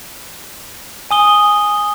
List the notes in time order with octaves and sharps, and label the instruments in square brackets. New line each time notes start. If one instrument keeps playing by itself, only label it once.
[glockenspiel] G#5 D#6 G7